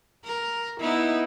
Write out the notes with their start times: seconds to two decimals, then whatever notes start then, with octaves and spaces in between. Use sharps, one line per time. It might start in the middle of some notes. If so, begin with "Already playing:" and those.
0.25 A#4
0.81 B3 D#4 E4